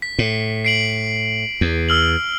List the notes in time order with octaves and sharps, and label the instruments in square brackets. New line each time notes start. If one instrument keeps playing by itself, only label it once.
[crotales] B6
[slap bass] A2
[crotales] C7 D7 F#7
[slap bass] E2
[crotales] E6 F6 F#7